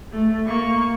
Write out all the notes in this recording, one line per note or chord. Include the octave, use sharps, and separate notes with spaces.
A3
A#3 C#6